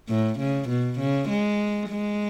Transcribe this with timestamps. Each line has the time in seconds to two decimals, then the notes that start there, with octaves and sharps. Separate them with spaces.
0.09 A2
0.39 C#3
0.69 B2
0.99 C#3
1.29 G#3
1.89 G#3